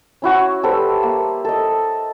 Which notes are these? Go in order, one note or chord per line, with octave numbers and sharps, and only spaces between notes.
C#4 E4 F#4 G#5
G3 A4 B4 C5
A#3
A4 D#5